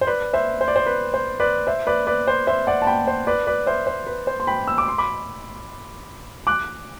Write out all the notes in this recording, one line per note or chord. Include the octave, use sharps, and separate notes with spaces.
C5
B4 D5
C5 E5
C5
D5
C5
B4
C5
B4 D5
C5 E5
B4 D5
B4 D5
C5
C5 E5
D5 F#5
A5
G5 B5
C5
B4 D5
B4 D5
C5 E5
C5
B4
C5
C6
G5 B5
E6
D6
C6
B5 D6
D6 F#6